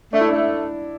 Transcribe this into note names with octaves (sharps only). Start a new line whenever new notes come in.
A3 D4
E4
A3 D4